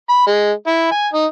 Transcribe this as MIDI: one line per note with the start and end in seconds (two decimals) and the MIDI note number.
0.09 0.26 83
0.27 0.52 56
0.67 0.87 64
0.91 1.08 80
1.14 1.25 63